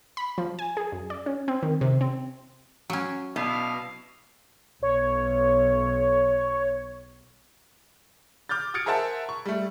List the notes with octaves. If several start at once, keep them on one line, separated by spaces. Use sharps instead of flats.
B5
F3
G#5
G#4
F#2
D5
C#4
C4
D#3
C3
C4
F#3 C#4
B2 D4 E4 F5
B1 C#5
D6 F6 G6 A6
D#6 F6 G#6 A6 C#7 D7
G#4 A#4 C5 E5 F#5 A5
C#6
G3 A3